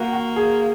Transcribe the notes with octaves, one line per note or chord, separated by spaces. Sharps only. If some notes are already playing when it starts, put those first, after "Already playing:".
Already playing: A#3 F#4
F#4
G#4